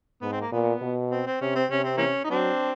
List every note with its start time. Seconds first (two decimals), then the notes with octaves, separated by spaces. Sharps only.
0.21 G#2 B3
0.32 C4
0.41 A#3
0.52 A#2 B3
0.81 B2
1.11 C4
1.26 C4
1.41 C3 C#4
1.55 C4
1.70 C3 C#4
1.84 C4
1.97 E3 A#3 C#4
2.24 D#4
2.30 F#3 C4 D4